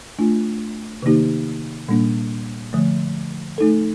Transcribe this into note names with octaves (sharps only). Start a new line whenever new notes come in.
A3 D4 F4
C3 D#3 A#3 D#4 G4
A#2 G3 A#3 D4
D3 F3 A3
A3 D#4 A4